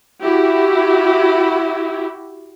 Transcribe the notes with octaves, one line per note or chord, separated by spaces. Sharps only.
E4 F#4 G4